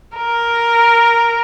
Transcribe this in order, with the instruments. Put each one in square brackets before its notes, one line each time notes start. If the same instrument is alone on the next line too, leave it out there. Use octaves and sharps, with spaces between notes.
[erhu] A#4